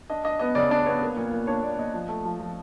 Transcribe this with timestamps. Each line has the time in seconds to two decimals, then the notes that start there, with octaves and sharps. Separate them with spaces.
0.10 D4 D#5
0.24 D4 D#5
0.39 B3 D#5
0.55 C#3 D5
0.71 D4 D5
0.86 B3 C#5
1.02 A#3
1.16 A#2
1.32 A#2
1.47 D4 C#5
1.63 A#2 D5
1.78 A#2 D#5
1.94 F3
2.09 A3
2.25 F3
2.39 F3